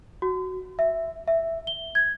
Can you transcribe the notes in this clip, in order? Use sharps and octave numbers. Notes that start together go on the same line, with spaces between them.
F#4
E5
E5
G7
G#6